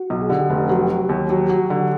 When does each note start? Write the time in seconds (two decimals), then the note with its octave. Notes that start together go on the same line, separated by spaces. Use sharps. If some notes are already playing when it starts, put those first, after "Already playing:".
Already playing: F#4
0.10 B1
0.21 G#4
0.29 D3 G4
0.50 F1
0.69 F#3
0.90 F#3
1.09 D#2
1.30 F#3
1.49 F#3
1.70 D3